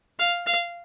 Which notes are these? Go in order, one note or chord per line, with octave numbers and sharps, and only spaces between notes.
F5
F5